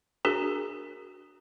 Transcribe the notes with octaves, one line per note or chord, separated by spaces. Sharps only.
D4 F#4 G#4 A#4